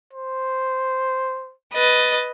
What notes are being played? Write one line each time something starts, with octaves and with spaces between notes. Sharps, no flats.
C5
B4 D#5 A6